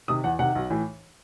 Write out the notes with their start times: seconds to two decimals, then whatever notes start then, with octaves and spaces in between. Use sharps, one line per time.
0.08 C3 D#3 D#6
0.24 E2 F#5
0.39 C3 D#3 F#5
0.55 B1
0.70 A2 E3